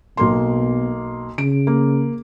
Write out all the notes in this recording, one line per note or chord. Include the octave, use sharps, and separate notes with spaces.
B1 B2 A#3 C6
C#3 D7
A#3